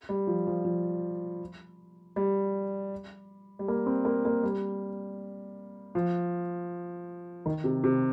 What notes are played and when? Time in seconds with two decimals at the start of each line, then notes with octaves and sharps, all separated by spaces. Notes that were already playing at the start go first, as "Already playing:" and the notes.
0.09 G3
0.27 F3
0.47 F3
0.65 F3
2.16 G3
3.59 G3
3.68 A#3
3.86 C4
4.05 A#3
4.25 A#3
4.43 G3
5.95 F3
7.46 D#3
7.64 C3
7.84 C3